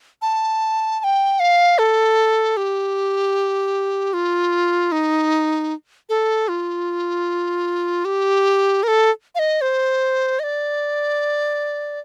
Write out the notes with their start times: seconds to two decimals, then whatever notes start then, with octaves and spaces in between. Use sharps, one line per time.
0.22 A5
1.00 A5
1.04 G5
1.40 F5
1.78 A4
2.57 G4
4.13 F4
4.92 D#4
6.09 A4
6.48 F4
8.05 G4
8.83 A#4
8.88 A4
9.35 F5
9.39 D#5
9.61 C5
10.39 D#5
10.44 D5